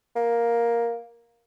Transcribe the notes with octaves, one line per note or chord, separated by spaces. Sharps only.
A#3